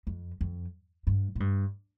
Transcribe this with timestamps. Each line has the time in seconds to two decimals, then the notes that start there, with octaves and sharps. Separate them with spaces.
0.07 F2
0.41 F2
1.07 G2
1.35 A2
1.40 G2